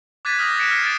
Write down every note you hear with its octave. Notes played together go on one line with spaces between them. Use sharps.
D6 F#6 G#6 A6 B6 D#7
D#6 F6 G6 A#6
F#6 A#6 C#7 D7 E7
F6 C7
A6 C7 D7 E7